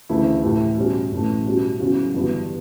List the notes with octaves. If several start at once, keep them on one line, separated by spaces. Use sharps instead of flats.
D2 C#3 E3 A3 E4
A2 E3 A3 E4 G4
B2 G3 C#4 F#4
A1 A2 E3 A3
B2 G3 C#4 F#4
E2 C#3 F#3 C#4 F#4
G1 G2 E3 B3 F#4